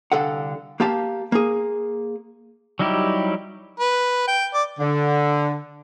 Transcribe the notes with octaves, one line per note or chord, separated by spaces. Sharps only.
C2 D3 A4 F5 F#5
A#3 G4 F5 A5
A#3 G#4
F#3 G3 D#4 E4 G4
B4
G5
D5
D3